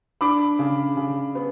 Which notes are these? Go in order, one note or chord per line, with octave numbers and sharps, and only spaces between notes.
D4 B5 D6
C#3
C#3
B3